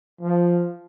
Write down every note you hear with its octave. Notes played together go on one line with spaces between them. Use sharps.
F3